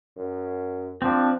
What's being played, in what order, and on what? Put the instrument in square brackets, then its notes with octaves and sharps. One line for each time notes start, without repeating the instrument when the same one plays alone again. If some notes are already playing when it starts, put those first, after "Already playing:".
[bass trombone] F#2
[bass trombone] F3 [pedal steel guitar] C4 D4